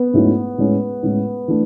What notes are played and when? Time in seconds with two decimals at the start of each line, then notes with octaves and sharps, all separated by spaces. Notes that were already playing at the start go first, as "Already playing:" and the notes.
Already playing: B3
0.14 G#2 F#3 A3 C#4 E4
0.58 A2 G#3 C#4 E4
1.03 A2 G#3 C#4 E4
1.48 E3 A3 D4